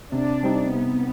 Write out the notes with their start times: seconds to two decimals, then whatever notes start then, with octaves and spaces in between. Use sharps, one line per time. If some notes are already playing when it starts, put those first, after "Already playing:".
0.12 C3 D4
0.43 G3 C4 D#4
0.73 C3 B3